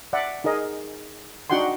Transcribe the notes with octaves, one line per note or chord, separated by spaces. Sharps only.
D5 E5 F#5
D#4 G#4 A#4 D#5
D4 D#4 F#4 F#5 G5 C6